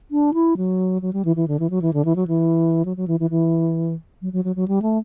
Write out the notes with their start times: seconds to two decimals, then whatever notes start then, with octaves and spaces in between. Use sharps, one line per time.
0.11 D4
0.34 E4
0.57 F#3
1.02 F#3
1.13 G3
1.25 E3
1.36 E3
1.48 D3
1.59 E3
1.70 F#3
1.82 E3
1.93 D3
2.05 E3
2.16 F#3
2.27 E3
2.85 F#3
2.97 F#3
3.08 E3
3.20 E3
3.30 E3
4.22 F#3
4.33 F#3
4.44 F#3
4.56 F#3
4.68 G3
4.82 A3